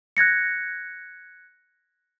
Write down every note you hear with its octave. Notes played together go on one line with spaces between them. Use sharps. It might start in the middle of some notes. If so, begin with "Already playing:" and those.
F#6 G#6 A#6 C#7